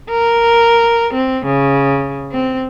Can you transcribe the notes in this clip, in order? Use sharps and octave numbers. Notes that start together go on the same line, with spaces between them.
A#4
C4
C#3
C4